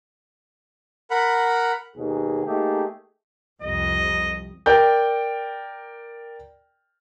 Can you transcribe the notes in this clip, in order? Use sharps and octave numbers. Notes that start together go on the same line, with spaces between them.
A#4 F#5 B5
D#2 B2 G#4
A3 A#3 D#4 G4 G#4
C2 F2 D#5
A#4 D5 G5 G6